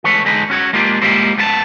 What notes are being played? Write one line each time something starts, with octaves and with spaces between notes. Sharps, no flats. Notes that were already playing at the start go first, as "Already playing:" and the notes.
E3 G#3 A3 B4 C#5
E2 D3 G#3 D#4 B4
C#4 F#4 C#5
G#3 A#3 D4 F4 G4
G3 G#3 A#3 E4 G4 C5
F2 A3 B3 F4 A5